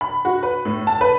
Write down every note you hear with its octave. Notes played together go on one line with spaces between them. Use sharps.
B5
F#4
B4
A2
A5
B4